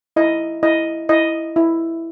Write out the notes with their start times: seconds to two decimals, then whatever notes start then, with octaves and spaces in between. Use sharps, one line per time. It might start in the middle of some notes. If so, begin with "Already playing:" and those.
0.16 E4 D#5
0.63 E4 D#5
1.09 E4 D#5
1.56 E4